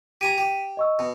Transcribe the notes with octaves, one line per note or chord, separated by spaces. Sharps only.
G4 G#5 A#5 B6 D7 D#7
G4
D#5 C#6 E6
B2